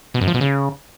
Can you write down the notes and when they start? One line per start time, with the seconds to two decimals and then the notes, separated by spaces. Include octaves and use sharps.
0.14 B2
0.21 F#2
0.28 F3
0.34 B2
0.41 C#3